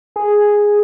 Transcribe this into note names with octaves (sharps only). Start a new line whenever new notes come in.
G#4